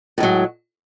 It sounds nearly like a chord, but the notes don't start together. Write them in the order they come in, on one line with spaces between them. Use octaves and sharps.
A2 G#3 F#3